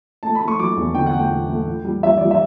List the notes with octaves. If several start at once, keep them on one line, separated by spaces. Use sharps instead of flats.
A3 A5
B5
A3
C#6
F#3 D6
E2
D3 G5
F#5
A3
G5
E2
A3
A2
G3
G3 E5
G3 D5
E5